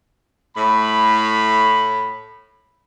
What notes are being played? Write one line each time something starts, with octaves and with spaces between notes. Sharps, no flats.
A2 B5